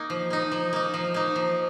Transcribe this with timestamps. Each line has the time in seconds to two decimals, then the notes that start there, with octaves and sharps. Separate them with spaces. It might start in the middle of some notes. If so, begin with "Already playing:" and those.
Already playing: A#3 D#4
0.10 F3
0.30 A#3 D#4
0.52 F3
0.73 A#3 D#4
0.94 F3
1.14 A#3 D#4
1.36 F3